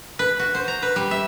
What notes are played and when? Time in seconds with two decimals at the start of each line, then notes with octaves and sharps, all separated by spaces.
0.19 B4
0.39 F#4
0.55 C5
0.68 A#5
0.83 B4
0.96 G3
1.11 E5